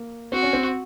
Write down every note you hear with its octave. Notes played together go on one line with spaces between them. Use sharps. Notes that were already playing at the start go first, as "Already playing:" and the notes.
Already playing: A#3
C4 F#4
C#4
C4